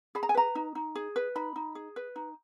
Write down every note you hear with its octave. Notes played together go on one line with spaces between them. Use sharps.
G#4 B5
A#5
G#5
B4 A#5
D#4
D#4
G#4
B4
D#4 B5
D#4
G#4
B4
D#4